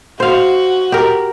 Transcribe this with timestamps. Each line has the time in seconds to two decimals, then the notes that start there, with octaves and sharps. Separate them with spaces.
0.20 F#4 C5 F5
0.92 G4 A#4